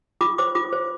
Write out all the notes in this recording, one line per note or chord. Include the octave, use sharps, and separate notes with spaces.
F4 D6
C5 D6
F4 D6
C5